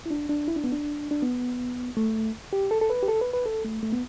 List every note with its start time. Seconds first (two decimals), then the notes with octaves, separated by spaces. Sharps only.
0.06 E4
0.11 D4
0.29 D4
0.48 E4
0.56 D4
0.64 B3
0.72 D4
1.11 D4
1.22 B3
1.97 A3
2.53 G4
2.71 A4
2.81 A4
2.90 B4
3.03 G4
3.08 A4
3.21 B4
3.33 B4
3.46 A4
3.65 A3
3.83 A3
3.92 B3